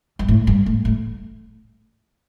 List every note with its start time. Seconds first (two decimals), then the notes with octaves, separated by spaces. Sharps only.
0.19 G2
0.28 A2
0.47 G2
0.66 A2
0.85 A2